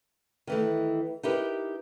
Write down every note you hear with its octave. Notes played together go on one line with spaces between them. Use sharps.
D#3 E3 A3
D#4 E4 G4 A#4 B4